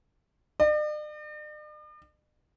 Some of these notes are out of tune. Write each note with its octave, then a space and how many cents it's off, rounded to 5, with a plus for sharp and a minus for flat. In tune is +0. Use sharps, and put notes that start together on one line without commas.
D5 +45